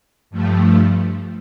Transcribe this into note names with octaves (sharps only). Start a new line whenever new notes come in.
G2 F3 A3